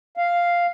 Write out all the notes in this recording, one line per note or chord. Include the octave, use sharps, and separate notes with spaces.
F5